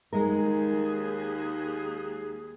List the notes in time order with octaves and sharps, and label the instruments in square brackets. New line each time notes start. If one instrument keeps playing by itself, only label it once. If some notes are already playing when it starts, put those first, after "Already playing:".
[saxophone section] D#2 G#4 [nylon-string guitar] G#3 D#4 A#4